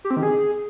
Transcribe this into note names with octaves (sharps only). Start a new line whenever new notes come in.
G4
C4
D#3
G#4